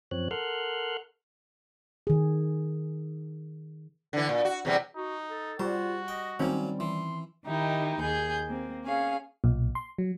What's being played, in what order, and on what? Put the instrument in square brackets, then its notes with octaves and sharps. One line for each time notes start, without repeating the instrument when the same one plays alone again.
[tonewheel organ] F#2 F3 C4 C#5 F#6
A4 A#4 F#5 C6 F6 F#6
[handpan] D#3 G#4
[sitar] D3 E3
A#2
F#4
E2 C3 G3
[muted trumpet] D#4 [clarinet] F#4
[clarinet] A4
[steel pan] G3 [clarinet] F4 [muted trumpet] F#4 [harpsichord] C5
[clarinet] D#5 [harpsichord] G5
[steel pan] D#3 C4 C#4 [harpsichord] F#3 A#3 [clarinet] G3
[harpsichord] E3 [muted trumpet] C6
[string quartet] D#3 D#4 E4 G4
D#2 G#4 G6
A#3 C4
C#4 G#4 F5
[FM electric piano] B1 A#2
C6
F#3